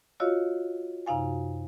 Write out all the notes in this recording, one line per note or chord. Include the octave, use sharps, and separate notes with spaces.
F4 F#4 C#5 D#5 F5 E6
F#2 C3 D#4 F5 G#5